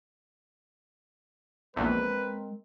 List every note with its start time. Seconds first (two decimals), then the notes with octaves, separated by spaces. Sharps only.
1.76 A#1 E2 G#3 C4 A#4 B4